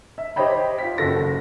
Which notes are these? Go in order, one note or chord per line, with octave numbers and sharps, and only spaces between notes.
E5
G4 C5 C#5 D#5 G5 B5
F4 B6
F#1 F#4 A4 A#6